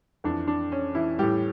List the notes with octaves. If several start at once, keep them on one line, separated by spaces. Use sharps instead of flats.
F2 E3 D4
D4
C#4
E3 E4
A2 E3 G3 G4